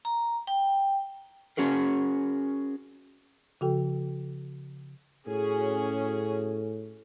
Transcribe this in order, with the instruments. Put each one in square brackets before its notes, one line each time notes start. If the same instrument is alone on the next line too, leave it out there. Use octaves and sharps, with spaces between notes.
[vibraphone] A#5
G5
[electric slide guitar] C#4 F#4 G#4 A#4
[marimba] C#3 F3 F#4 A4 G5
[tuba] A2 [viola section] C#4 F#4 G#4